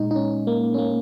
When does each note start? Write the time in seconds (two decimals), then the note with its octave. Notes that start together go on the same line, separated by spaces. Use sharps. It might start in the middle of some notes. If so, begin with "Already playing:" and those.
Already playing: A#2 G#3 D#4
0.11 D#4
0.16 C#4
0.47 A#3
0.74 C#4
0.78 A#3